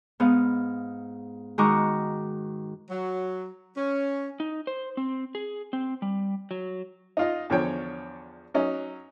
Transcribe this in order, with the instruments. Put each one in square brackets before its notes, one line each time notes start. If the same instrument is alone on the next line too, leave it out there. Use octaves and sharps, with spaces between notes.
[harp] G#2 B3 F5
D#3 G#3 F#4 A#5 C#6 D6
[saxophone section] F#3
C#4
[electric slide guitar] D#4
C5
C4
G#4
C4
G3
F#3
[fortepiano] D#4 F4 D#5
E2 D3 F3 C#5 G5
F#3 C#4 D#4